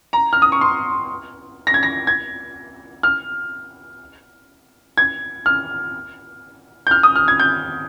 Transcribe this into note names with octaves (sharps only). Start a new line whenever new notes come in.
A#5
F6
D#6
C#6
C6
A#6
G#6
A#6
G#6
F6
G#6
F6
G6
F6
D#6
F6
G#6
G6